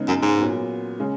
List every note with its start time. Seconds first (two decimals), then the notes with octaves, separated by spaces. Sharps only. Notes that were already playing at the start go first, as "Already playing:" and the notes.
Already playing: C#3 G#3 B3 D#4
0.08 F#2
0.23 G#2
0.38 A#2 F#3 B3
0.99 C#3 G#3